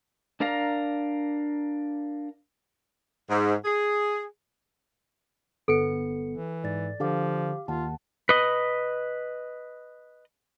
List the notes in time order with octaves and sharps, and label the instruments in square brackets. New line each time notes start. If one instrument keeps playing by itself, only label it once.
[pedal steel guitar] D4 A#4 D5 F5 A#5
[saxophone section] G#2
G#4
[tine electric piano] G1 B3 C#7 [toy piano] A4
[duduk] E3
[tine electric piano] G#2 [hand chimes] D5 A6
[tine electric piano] D3 [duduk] F3 [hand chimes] G4 F5 D6
[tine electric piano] D#2 [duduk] F4 [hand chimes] F#5 A5
[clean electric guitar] B4 D#5